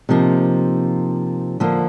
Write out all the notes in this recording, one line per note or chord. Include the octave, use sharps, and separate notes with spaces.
C3 F3 A#3 D#4
D3 F3 A#3